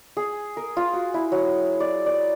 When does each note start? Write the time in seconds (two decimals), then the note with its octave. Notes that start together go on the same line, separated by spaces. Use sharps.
0.17 G#4
0.57 A#4
0.77 F4
0.93 F#4
1.14 E4
1.32 F#3
1.80 D5
2.06 D5